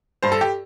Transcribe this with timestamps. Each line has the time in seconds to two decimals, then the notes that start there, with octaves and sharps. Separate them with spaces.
0.23 G2 C5
0.32 A4
0.41 G4